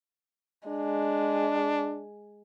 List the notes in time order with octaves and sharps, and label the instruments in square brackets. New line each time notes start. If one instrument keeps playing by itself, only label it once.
[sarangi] G#3 [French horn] D4